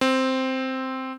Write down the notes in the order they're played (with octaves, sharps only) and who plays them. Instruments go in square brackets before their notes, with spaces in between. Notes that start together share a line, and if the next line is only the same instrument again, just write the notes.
[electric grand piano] C4